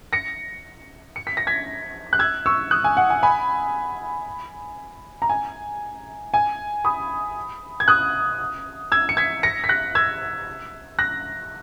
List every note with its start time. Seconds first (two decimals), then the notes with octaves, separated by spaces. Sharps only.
0.13 A#6 C#7
1.16 C#7
1.27 B6
1.37 A#6
1.47 G#6 B6
2.13 F#6
2.19 E6 G#6
2.46 C#6 E6
2.71 D#6 F#6
2.84 G#5
2.97 F#5
3.10 G#5
3.23 G#5 B5
5.22 A#5
5.29 G#5
6.34 G#5
6.84 B5 D#6
7.80 G#6
7.88 D#6 F#6
8.92 E6 G#6
9.09 C#7
9.17 G#6 B6
9.43 A#6 C#7
9.64 B6
9.69 F#6 A#6
9.95 E6 G#6
10.99 F#6 A#6